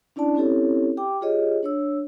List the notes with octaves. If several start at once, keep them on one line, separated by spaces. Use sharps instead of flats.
C#4 D4 E4 D5 A5
C4 C#4 E4 G4 A4 C#5
G4 G5 D6
F4 G4 G#4 C#5 D#5
D4 C#5 E6